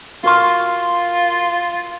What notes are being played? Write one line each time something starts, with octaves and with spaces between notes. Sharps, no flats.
F4 F#4 A#4 C6